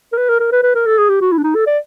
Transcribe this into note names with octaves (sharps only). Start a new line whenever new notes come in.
A#4
B4
A#4
A#4
B4
B4
A#4
A4
G#4
G4
F#4
E4
D4
D#4
A4
D5